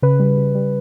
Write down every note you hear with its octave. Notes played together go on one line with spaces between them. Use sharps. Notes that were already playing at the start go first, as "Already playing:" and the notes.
C#3 B4
G3
C#3
G3